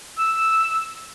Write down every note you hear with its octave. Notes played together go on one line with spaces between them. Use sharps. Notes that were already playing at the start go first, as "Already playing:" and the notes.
E6